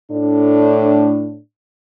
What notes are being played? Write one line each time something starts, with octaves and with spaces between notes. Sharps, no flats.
A2 D4